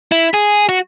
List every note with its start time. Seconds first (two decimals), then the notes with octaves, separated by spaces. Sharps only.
0.12 E4
0.34 G#4
0.69 F#4